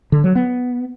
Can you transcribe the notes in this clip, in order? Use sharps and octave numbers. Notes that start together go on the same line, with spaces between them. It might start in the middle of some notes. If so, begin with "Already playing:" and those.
D3
F#3
B3